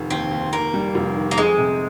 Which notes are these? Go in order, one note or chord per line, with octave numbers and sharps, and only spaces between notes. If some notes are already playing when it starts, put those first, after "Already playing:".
Already playing: F1 D#3
D#2 C4
D#2
D#2 A#3
G3
F1
D#3
A#3
F2 G#3
C3